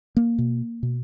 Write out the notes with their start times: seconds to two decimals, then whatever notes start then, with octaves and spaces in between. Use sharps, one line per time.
0.17 A#3
0.38 B2
0.83 B2